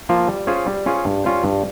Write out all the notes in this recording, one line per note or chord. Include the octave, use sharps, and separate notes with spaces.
F3 A#3 F4
G3
C#4 F4 G#4 C5
G3
C#4 F4 G#4 C5
G2
G3 C#4 F4 C5
G2